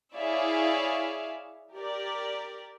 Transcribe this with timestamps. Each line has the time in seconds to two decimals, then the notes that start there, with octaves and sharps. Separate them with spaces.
0.16 E4 G#4 C#5 D5 E5 F5
1.74 G4 A#4 D5